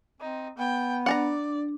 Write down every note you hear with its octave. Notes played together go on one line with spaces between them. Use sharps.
C4 D#4
B3 G5
D4 D5 F#5 A5 A#5